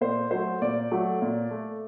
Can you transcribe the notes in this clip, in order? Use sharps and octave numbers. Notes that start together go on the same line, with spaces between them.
A#2 C5
F#3 A3 C5
A#2 D5
F#3 A3
A#2
A3